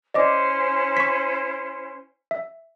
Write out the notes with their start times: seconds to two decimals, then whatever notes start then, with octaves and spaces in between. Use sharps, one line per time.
0.14 C#4 E4 C5 D5 D#5 D6
0.97 C#6 B6
2.31 E5